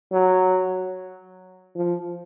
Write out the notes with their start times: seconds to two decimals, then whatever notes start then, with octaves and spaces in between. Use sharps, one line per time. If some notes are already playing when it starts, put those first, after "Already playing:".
0.13 F#3
1.76 F3